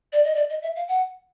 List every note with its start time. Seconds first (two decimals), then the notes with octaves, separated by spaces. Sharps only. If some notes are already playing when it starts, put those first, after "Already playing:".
0.13 D5
0.24 D#5
0.35 D5
0.50 D#5
0.63 E5
0.76 F5
0.88 F#5